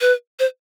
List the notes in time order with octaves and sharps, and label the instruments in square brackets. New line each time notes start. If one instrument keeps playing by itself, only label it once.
[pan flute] B4
C5